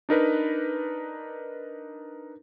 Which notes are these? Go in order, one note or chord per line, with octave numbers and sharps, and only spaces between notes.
D4 D#4 A#4 B4